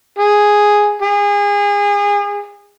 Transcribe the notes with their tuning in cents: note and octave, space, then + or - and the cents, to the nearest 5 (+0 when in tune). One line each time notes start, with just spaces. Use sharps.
G#4 +0
G#4 -30